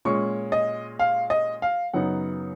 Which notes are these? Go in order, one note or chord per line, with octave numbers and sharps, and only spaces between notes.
A#2 G#3 C#4 C#6
D#5
F5
D#5
F5
F#2 C#3 F#3 B3 D#4 F#5